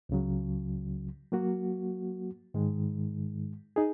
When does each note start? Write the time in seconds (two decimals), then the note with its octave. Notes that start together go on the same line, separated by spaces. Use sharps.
0.09 C#2 C#3 F#3
1.32 F#3 A#3 F#4
2.54 G#2 D#3 G#3
3.76 D#4 G#4